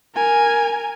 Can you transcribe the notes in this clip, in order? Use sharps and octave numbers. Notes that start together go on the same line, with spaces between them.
A#4 G#5